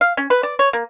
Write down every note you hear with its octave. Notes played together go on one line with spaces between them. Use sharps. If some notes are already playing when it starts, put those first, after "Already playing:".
F5
C#4
B4
D5
C#5
A#3